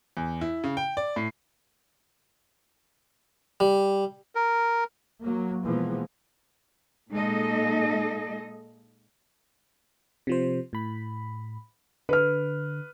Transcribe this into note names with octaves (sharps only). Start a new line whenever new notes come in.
E2
E4
C#3
G5
D5
A2
G3
A#4
F#3 A#3
B2 E3 F3 G#3 A#3 B3
A#2 G#3 A#3 D#4 A4 D#5
C3 F3 C5
A2 B5
D3 B4 F6